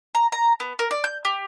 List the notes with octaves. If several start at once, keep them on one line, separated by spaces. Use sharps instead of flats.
A#5
A#5
B3
A#4
D5
G6
G4